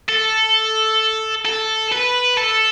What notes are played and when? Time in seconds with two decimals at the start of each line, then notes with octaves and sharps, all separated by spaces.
0.09 A4
1.45 A4
1.92 B4
2.37 A4